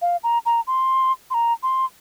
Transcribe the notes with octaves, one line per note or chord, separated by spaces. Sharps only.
F5
A#5
A#5
C6
C6
A#5
C6